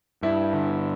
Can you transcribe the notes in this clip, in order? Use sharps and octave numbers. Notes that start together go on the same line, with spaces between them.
G2 E4
D3